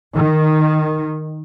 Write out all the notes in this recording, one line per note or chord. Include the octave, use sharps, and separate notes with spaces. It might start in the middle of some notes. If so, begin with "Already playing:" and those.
D#3